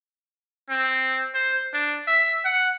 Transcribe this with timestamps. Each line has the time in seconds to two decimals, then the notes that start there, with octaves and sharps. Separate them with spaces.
0.70 C4
1.34 C5
1.73 D4
2.07 E5
2.45 F#5